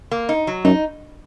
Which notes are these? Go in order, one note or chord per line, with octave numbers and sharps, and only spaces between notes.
A#3
D#4
F#3
F#2 D#4